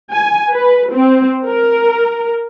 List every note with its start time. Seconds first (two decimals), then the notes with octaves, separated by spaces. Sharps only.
0.12 G#5
0.52 B4
0.92 C4
1.47 A#4